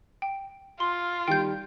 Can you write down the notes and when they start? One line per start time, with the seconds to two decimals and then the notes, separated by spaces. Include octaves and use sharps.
0.22 G5
0.80 F4 C6
1.28 D#3 G3 G5 G6